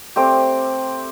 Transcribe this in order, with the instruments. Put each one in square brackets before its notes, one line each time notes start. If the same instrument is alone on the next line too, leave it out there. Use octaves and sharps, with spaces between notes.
[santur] A3 C4 G4 D5